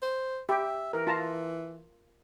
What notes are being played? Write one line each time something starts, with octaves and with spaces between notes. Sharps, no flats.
C5
G4 E5
E3 A#4
F4 A5 A#5